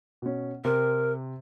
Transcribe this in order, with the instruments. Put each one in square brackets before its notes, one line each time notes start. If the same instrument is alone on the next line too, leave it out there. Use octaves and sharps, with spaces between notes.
[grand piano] B2 C#4
[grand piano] C3 C4 [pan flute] A#4